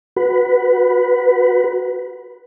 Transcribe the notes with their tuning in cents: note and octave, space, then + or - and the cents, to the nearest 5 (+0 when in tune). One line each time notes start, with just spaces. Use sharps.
F#4 +0 B4 +0